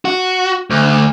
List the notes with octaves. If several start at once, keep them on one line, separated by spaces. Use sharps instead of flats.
F#4
D2